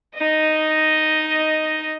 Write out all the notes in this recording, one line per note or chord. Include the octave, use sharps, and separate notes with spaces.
D#4 D#5